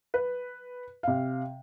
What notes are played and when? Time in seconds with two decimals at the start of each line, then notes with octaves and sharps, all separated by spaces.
0.14 B4
1.03 C3 F5